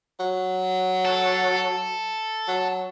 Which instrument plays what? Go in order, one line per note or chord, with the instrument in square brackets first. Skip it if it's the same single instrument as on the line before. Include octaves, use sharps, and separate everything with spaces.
[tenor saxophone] F#3
[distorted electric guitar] A4
[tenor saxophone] F#3